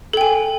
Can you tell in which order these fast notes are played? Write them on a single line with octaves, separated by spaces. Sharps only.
A4 G5 G#5